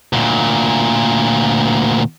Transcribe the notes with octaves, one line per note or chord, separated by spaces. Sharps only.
D2 A#2